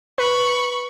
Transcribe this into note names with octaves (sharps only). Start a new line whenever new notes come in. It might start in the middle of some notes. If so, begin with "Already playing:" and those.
B4 B5 C#6